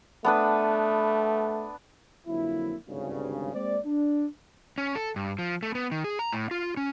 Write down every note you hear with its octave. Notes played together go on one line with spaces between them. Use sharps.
A3 B3 D4 B4
F2 D3 F3 F#3 A#3 E4
G#1 D2 G2 C#3
G#3 A#3 C4 C5 D5
D4
C#4
A4
G2
F3
A3
B3
D#3
G#4
A#5
A2
F4
C#4